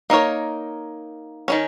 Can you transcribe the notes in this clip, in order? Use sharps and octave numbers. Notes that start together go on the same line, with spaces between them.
A#3 D#4 A#4 C#5
D#3 F#3 C#4